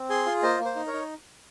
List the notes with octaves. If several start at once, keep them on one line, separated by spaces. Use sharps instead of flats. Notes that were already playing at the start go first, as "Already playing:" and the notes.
Already playing: C4
G#4 G#5 C6
F4
A#3 C5 D#5
A#3
C5
D#4
A#4 C#5
D#4